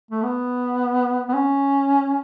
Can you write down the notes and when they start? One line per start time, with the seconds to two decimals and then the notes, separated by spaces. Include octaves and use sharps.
0.11 A3
0.23 B3
1.29 B3
1.34 C#4